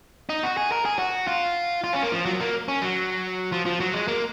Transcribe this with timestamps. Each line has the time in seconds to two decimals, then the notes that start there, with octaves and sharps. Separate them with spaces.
0.29 D#4
0.43 F#4
0.57 G#4
0.72 A#4
0.85 G#4
0.99 F#4
1.28 F4
1.84 F4
1.93 C#4
2.03 A#3
2.12 F3
2.26 F#3
2.40 A#3
2.68 C#4
2.82 F#3
3.52 F3
3.66 F3
3.80 F#3
3.94 G#3
4.08 A#3